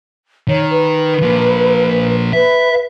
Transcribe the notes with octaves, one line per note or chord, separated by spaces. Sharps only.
D#3 C#5
B4
F3 A#3
B4 E5